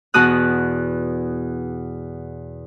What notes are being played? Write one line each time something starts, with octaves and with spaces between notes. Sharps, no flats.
E2 B2 F#4 D#6 F#6